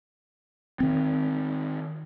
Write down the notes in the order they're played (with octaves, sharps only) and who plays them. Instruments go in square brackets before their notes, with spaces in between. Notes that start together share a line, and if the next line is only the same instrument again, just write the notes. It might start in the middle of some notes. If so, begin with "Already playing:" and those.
[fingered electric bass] D#3 C4